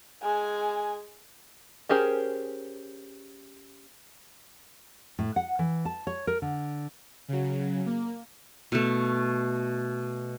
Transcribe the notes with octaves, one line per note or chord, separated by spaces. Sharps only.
G#3 G#5
C#4 G4 G#4 A#4 C5
A2
F#5
E3
A5
C#5
A#4
D3
C#3 F#3
A#3
B2 A3